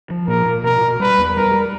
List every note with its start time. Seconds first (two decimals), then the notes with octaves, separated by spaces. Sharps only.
0.10 F3
0.28 A#2 A#4
0.46 A#2
0.63 B2 A#4
0.81 B2
1.00 G3 B4
1.18 E2
1.36 G3 A#4
1.53 G3